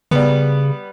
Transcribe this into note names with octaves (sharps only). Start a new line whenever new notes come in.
C#3 G3 B3